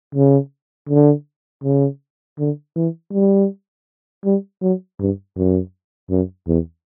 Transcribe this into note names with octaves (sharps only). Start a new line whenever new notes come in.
C#3
D3
C#3
D3
E3
G3
G3
F#3
G2
F#2
F#2
E2